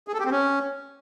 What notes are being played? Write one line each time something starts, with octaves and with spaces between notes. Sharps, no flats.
G#4
A4
G4
C4
C#4